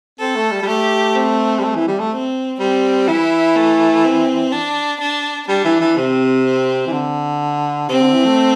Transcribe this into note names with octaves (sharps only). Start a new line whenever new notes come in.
C4 A4
A3
G3
G3
A3 G4
C4
G3
A3
E3
G3
A3
C4
G3 C4
E3 E4
A3
C4
D4
D4
G3 D4
E3
E3
C3 C4
C4
E3
D3
C3 C4
D3
E3
A3